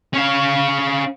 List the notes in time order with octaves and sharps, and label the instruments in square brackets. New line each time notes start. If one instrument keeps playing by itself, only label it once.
[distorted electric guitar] C#4 F5